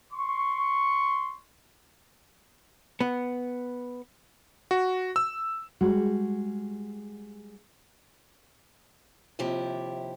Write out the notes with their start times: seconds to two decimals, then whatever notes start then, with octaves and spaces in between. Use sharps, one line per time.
0.12 C6 C#6
3.00 B3
4.71 F#4
5.16 E6
5.81 G3 G#3 F#4
9.39 D#2 C3 F3 E4 G4